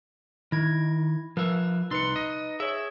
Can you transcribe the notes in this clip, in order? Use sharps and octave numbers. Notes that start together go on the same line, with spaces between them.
D#3 E4 G#6
F3 A#4 B4 E5
C2 D#4 B4 C6 C#7
D#5
G#4 C#5 E5